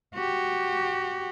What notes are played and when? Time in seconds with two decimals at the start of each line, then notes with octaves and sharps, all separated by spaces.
0.15 F#4 G4